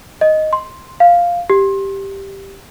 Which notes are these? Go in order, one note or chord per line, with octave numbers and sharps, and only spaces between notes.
D#5
C6
F5
G4